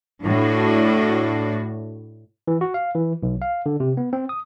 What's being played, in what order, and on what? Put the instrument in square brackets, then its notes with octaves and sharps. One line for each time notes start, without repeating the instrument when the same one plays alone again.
[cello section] A2 D4 F#4
[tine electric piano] E3
F#4
F5
E3
B1
F5
D3
C3
B3
C4
D#6